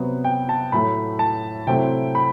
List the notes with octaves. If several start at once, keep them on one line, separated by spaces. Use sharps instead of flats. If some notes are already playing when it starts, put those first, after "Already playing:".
Already playing: C3 F#3 B3
G5
A5
A2 F#3 A3 B5
A5
C3 F#3 A3 C4 E4 G5
B5